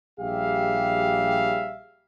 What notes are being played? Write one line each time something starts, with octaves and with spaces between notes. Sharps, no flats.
A#1 G3 G4 G#4 E5 F5